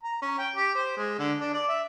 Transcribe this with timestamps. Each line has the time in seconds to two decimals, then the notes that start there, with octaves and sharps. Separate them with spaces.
0.04 A#5
0.22 C#4
0.38 G5
0.56 G4
0.75 C5
0.97 G#3
1.19 D3
1.40 D4
1.54 D5
1.69 E5